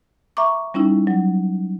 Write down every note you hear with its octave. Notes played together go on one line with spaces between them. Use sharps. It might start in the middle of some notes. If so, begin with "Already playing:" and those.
E5 A#5 C#6 D6
G3 C#4 D#4 E4
F#3